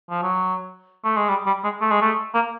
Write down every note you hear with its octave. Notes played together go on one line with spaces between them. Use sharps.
F3
F#3
A3
G#3
G3
G3
G#3
A3
G#3
A3
A#3